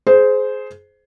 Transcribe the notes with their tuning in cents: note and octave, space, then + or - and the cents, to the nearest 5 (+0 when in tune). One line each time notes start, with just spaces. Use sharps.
G#4 +25 C5 -5